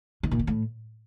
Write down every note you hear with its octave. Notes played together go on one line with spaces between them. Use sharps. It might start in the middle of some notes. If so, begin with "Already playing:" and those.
D#3
A#2
D#3
A2